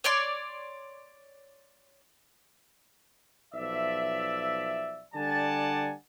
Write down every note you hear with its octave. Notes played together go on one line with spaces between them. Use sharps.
C#5 D5 C6
B1 F3 D5 E5
D3 G3 D5 F#5 G#5 A5